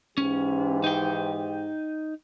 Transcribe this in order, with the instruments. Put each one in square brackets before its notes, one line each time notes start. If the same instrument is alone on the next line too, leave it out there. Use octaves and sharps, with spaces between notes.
[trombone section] G#2 E3 G4 [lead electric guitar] C#4
[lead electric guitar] D#4 G5